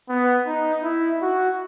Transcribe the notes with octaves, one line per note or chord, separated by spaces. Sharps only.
B3
D#4
E4
F#4